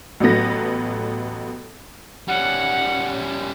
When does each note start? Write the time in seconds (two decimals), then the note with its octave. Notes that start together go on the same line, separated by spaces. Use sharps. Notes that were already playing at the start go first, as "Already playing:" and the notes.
0.20 A1 F#3 A3 B3 A#6
2.28 G3 C#4 F#5